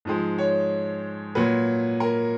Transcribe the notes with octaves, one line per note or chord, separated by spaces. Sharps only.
G#2 F3 G#3
C#5
A#2 F#3 B4
A#4